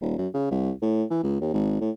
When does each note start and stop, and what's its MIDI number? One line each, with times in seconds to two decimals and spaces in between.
0.01 0.16 27
0.18 0.28 42
0.34 0.49 49
0.51 0.72 36
0.82 1.04 45
1.10 1.19 52
1.23 1.37 37
1.41 1.50 39
1.54 1.79 32
1.81 1.90 45